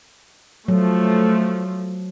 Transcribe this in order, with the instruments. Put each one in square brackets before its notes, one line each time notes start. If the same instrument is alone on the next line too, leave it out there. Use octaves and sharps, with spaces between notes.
[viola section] F3 A3 [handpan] F#3